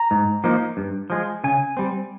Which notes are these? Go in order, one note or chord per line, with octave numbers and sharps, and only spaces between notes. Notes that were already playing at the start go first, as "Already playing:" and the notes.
Already playing: A#5
G#2
F3 A#3 D#4
G2
F3 G#3
C#3 G#5
G3 C4